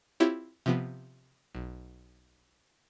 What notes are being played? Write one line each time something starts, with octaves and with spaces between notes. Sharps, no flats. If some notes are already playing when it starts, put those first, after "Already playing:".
C4 E4 F4 G4 C#5
C3 F3 B3
B1